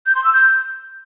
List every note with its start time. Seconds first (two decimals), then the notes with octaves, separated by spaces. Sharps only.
0.06 G6
0.15 C6
0.24 E6
0.33 G6